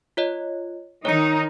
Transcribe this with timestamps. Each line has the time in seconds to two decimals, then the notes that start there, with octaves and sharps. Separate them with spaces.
0.17 F4 C#5 D#5
1.05 D#3 D#4 C#5 C#7